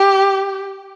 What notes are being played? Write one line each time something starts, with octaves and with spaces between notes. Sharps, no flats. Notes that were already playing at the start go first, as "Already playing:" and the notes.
Already playing: G4